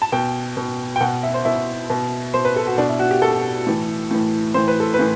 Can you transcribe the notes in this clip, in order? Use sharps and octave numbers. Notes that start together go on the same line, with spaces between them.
A5
B2 G5
B2
G5
B2 F#5
E5
C5
B2 E4
B2
B2 C5
B4
A4
F#4
B2 D4
E4
F#4
G4
B2 A4
A2 E3
A2 E3
A2 E3 C5
B4
A4
B4
A2 E3